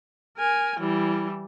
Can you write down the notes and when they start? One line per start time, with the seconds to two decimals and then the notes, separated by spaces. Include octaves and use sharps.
0.37 A#4 G#5
0.80 E3 G3